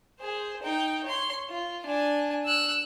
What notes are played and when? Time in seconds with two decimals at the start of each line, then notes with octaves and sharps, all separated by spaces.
0.20 G#4 C5
0.63 D#4 G5
1.04 C#5 C6
1.49 F4
1.86 D4 G#5
2.45 E6 F#6